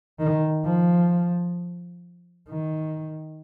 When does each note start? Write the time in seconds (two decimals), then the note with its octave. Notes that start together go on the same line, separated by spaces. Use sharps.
0.19 D#3
0.65 F3
2.49 D#3